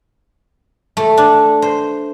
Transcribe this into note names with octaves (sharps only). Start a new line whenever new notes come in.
A3
D4
C5